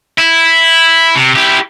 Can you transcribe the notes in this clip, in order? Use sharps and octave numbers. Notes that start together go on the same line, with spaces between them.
E4
C3
E4 G4